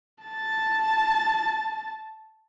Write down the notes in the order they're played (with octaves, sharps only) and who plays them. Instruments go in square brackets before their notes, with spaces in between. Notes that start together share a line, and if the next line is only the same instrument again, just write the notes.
[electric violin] A5 A6